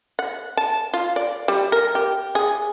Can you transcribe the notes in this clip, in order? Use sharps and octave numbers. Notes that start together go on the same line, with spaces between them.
F#5
A5
F4
D5
G3
A#4
G4
G#4